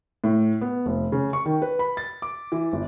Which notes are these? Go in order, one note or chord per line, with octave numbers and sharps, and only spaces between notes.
A2
B3
F1
C#3
C#6
D#3
B4
B5
A6
D6
E3
G1